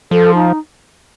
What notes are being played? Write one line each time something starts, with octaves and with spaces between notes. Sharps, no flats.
F3 A4
D#4